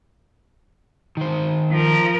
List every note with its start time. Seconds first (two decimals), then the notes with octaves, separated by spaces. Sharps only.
1.17 D#3 C5
1.71 F3 A#4